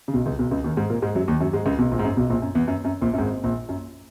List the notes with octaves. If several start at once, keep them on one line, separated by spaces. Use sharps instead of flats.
C#3
B1 B2
C#2 C#3
B1 B2
C#2 C#3
D#2 D#3
G#2 G#3
A#2 A#3
G#2 G#3
F#2 F#3
D#2 D#3
F#2 F#3
G#2 G#3
C#2 C#3
B1 B2
A#1 A#2
G#2
F#2
B1 B2
A#1 A#2
F#2
E2
F#2
F#2
A#1 A#2
F#2
G#1 G#2
A#1 A#2
F#2